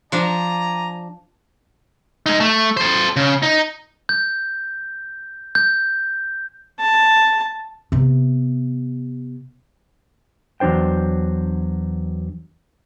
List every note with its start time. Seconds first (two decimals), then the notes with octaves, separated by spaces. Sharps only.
0.12 F3 D4 D5 G#5 A#5
2.26 G#3 D#4
2.40 A3
2.77 A4 C5
3.16 C#3
3.42 D#4
4.09 G6
5.55 G6
6.80 A5
7.92 C3 B3
10.60 E2 F#3 D4 C5 G5